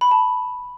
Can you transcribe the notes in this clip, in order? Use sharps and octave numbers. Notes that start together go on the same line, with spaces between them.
B5
A5